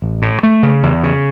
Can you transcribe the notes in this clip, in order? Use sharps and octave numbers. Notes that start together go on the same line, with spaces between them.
A1
A2
A3
C#3
E2
C#3